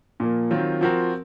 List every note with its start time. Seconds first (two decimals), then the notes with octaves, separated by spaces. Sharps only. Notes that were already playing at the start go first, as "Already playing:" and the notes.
0.20 A#2 F3 A#3
0.51 D#3 F#3 C4 F4
0.81 F3 C4 F#4 A#4